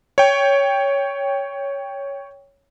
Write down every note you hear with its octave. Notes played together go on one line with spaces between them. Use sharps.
C#5 G5